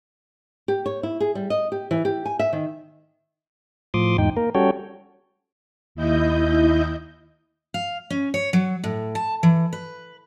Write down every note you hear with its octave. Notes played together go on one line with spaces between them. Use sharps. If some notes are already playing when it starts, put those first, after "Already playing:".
G4
C#5
E4
G#4
G3
D#5
G4
E3
G4
G#5
E5
D#3
A2 F3 C6 D6 D#6
E2 G#2 D#4 G5
A#3 A#4
G3 C#4 F#4 A4 C#5 G5
D#2 E4 D#5 G6
F5
C#4
C#5
F#3
A2
A5
E3
B4